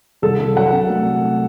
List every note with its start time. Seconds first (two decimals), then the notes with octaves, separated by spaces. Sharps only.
0.22 C2 A4
0.39 C2
0.56 F#3 F#5
0.72 C3
0.90 A3